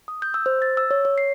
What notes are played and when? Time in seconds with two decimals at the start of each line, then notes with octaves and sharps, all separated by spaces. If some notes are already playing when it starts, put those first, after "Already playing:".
0.08 D#6
0.22 G6
0.34 E6
0.46 C5
0.62 A6
0.77 E6
0.91 C#5
1.05 C#5
1.18 C7